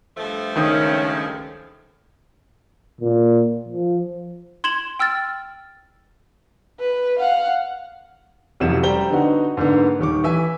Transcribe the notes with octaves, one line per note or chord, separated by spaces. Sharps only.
G2 F3 A3
C#2 D#3 C#4 D#6
A#2
F3
C6 G#6 E7 F#7 G7
G5 E6 F6 A6
B4
F5 F#5
F1 F2 F#3 C#4 E4 E7
G3 G4 C5 G5 A#5 G7
D3 B3 D#4 F#4
G#2 D3 A#3 B3
D#1 D#3 C#6 D6
E3 E5 G#5